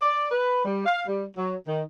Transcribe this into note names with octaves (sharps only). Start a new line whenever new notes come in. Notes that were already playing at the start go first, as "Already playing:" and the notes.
D5
B4
G3
F5
G3
F#3
D#3